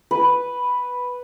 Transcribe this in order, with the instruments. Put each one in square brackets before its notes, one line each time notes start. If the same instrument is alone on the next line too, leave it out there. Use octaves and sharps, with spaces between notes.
[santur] B4